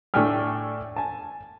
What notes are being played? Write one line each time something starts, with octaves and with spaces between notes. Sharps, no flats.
A2 A3 D4 G5 G#5 F6
G#5 A5